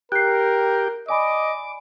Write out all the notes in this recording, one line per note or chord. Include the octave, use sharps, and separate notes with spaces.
G4 A#4 G5 F#6 C7
D5 D#5 G#5 B5 D6